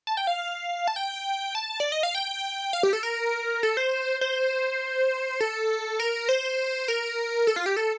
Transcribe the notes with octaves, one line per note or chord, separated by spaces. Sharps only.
A5
G5
F5
A5
G5
A5
D5
D#5
F5
G5
F5
G4
A4
A#4
A4
C5
C5
A4
A#4
C5
A#4
A4
F4
G4
A4